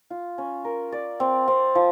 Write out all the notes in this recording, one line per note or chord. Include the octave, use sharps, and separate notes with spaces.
F4
C#4
A#4
D5
C4
C4
F3